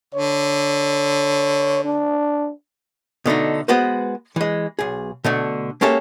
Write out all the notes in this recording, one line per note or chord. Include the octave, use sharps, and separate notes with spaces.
D3 C#5
D4
B2 D3 A3 D#4
G#3 B3 F#4 B4 C5
E3 G#3
B1 G#4
B2 D3 A3
G#3 A#3 C#4 G4 A4 E5